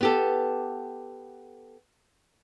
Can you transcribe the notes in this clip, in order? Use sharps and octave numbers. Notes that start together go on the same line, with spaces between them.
B3 G4 A4